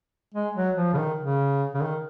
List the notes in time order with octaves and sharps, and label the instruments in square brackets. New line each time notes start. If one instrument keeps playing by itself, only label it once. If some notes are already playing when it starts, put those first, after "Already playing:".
[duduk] G#3
F#3
F3
C#3
D#3
C#3
C#3
D#3